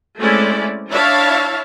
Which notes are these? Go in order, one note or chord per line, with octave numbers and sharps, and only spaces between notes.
G#3 A3 C4 C#4 E4 D5
D4 E4 C#5 E5 F5 A5